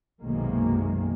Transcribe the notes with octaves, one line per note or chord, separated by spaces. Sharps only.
B1 F#2 C3 D#3 G#3 A#3